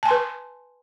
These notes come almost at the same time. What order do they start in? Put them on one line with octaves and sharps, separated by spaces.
A5 G#5 C6 B4